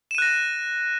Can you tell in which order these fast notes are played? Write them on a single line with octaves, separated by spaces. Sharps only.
E7 D#7 F#6 A#6